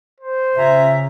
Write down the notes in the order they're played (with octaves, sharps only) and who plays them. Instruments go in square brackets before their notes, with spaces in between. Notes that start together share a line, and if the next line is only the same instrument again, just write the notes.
[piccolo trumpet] C5
[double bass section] C#3 [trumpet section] F4 G#5 A#5 [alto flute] E5